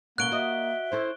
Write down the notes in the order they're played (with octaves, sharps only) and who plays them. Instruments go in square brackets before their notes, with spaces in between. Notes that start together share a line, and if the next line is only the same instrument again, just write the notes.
[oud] B2 A3 C#4 [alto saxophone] A#3 [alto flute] F#5 [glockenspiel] F#6 D7 G7
[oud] F#4 D#5 [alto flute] E5
[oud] C#4 E4 A4 [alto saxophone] C5